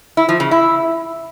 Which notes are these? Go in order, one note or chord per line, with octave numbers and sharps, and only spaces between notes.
E4
F3
C#3
E4